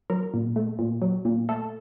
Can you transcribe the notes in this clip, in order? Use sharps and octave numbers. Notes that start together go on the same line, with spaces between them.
F#3 A#4
A#2
A3
A#2
F#3
A#2
A3 A4